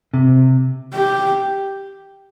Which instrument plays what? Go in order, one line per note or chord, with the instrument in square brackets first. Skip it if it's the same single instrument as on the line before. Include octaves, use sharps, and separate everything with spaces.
[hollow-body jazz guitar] C3
[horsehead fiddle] G4